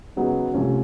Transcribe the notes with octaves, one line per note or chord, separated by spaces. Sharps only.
C#3 F#3 B3 D#4 F#4
C2 C3 F3 A3 C#4